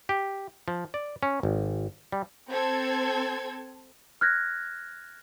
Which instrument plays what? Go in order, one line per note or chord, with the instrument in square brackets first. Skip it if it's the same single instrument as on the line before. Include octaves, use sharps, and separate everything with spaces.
[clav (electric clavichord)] G4
F3
D5
C#4
G#1
G3
[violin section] C4 A4 G#6
[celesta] F6 F#6 G#6 A#6